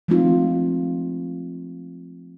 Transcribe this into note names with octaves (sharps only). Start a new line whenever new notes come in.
F3 G#3 A3 C4 D#4 F4